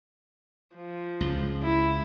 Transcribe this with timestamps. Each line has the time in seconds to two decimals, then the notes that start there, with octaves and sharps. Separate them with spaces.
0.75 F3
1.21 C#2
1.63 E4